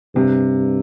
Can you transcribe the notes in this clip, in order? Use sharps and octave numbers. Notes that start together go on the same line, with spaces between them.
G2 C3